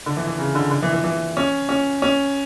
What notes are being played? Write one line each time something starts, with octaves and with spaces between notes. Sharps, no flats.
D3
E3
E3
C#3
D3
D3
E3
E3
E3
C#4
C#4
C#4